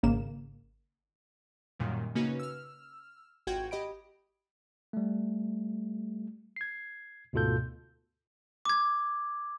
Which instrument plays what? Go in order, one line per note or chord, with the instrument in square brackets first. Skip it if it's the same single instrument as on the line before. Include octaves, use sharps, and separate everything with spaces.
[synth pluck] G#1 C#3 A#3 E7
[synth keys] F#2 A#2 D#3 G3
C#3 A#3 C#4 D#4 F#4 B4
E6 F6
G#1 F4 F#4 F#5 G5 G#6
G4 D#5 B5 D7
[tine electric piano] G3 A3
G#6 C7
D2 G#2 B2 F4 A4 G6
[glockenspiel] D6 G#6